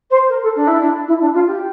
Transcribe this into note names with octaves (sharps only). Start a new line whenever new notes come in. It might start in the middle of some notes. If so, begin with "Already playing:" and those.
C5
A#4
A4
D4
E4
D4
E4
D4
F4
G4